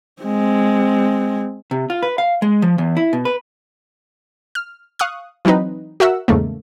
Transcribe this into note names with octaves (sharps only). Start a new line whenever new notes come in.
G#3 C4
C3
F4
B4
F5
G#3
F3
E2
E4
B2
B4
F6
F5 C#6 D#6 F#6
E3 F#3 C4 D#4 B4
F#4 A#4 E5 F#5 E6
E2 G#2 C#3 A3 A#3